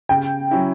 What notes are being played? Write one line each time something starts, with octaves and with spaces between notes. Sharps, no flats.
C#3 G5
F#3 C#4 E4